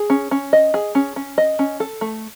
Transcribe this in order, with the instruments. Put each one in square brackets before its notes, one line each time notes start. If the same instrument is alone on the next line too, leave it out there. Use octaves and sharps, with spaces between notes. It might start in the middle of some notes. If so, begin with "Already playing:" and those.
Already playing: [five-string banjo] G#4
C#4
C#4
D#5
G#4
C#4
C#4
D#5
C#4
A4
A3